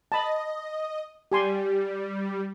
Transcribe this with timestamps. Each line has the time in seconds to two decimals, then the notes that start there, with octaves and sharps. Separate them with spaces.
0.12 D#5 A5 B5
1.32 G3 G4 G#5 C6